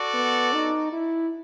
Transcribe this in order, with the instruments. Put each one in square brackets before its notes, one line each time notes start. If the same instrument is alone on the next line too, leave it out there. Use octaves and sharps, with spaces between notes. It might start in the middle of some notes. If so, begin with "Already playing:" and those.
Already playing: [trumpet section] F#4 A4 D5
[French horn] B3
D#4
E4